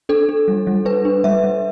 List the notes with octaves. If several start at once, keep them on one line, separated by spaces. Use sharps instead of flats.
D4 A4
D4
G3
G3
D4 B4
D4
G3 E5
G3